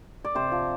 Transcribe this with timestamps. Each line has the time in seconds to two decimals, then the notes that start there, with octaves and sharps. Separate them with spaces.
0.25 D5
0.35 C3 C5
0.52 F3